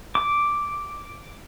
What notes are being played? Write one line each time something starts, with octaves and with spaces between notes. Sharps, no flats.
D6